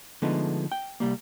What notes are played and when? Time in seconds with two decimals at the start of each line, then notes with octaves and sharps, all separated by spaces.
0.22 D3 F3 G#3 A3 B3 D#4
0.72 G5
1.00 C2 G3 A#3